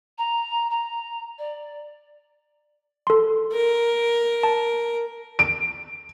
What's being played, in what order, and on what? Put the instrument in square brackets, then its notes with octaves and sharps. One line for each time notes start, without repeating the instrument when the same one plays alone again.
[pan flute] A#5
A#5
D5
[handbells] A4 C6
[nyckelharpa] A#4
[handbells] A5
[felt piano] D7